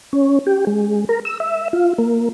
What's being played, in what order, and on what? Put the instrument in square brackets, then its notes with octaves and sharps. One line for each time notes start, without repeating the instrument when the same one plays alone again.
[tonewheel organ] C#4
G4
G#3
A#4
E6
E5
F4
A#3